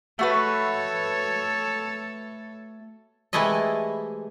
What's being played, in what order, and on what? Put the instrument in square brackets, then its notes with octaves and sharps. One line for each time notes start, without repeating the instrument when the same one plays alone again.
[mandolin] A3 F#4 B4 [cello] A4 C#5
[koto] C3 E3 G#3 A3 E4 D#5